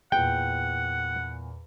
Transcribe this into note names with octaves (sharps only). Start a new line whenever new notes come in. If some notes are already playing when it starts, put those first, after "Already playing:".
E2 A#2 F#5 G5